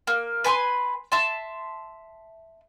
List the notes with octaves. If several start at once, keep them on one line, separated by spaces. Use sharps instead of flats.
A#3
B4 G#5 B5 C6
E5 A5 C6